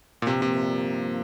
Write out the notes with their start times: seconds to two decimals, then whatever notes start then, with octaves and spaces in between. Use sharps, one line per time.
0.22 A#2
0.27 G2 C3 F3 A#3
0.42 C3